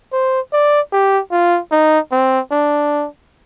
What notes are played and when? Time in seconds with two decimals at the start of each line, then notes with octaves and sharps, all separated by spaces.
0.12 C5
0.53 D5
0.92 G4
1.32 F4
1.72 D#4
2.12 C4
2.51 D4